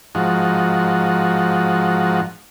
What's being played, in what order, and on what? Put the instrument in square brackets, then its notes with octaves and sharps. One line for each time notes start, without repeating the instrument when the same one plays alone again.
[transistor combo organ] G#2 F3 D#4 F#4